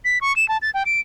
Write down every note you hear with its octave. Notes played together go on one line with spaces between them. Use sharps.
B6
C#6
E7
A5
A6
G5
D7